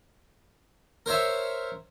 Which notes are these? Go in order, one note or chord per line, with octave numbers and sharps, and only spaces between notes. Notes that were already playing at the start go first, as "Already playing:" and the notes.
A#4 C5 C#5 E5